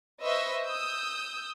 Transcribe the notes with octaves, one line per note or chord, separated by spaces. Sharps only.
B4 C5 D#5 E5 C#6 E6
D#6 E6 G6